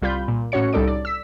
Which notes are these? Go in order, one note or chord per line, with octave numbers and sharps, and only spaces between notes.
C2 G3 F4 B5 G6
A#2
A2 C#4 F#4 C#5 C#7
C2 G3 D#4 A4 D5 D7
D5
E6 B6